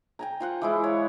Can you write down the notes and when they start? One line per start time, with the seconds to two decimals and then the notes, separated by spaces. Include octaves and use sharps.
0.19 G5 G#5 A#5
0.40 F4 C5 F#5
0.61 E3 G#3 E4
0.84 C#5